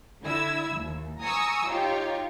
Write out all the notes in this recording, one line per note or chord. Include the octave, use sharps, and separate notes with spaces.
D3 E4 E6 G#6
D#2
G#5 A#5 C#6 D#6 E6
D#4 F4 G4 C#5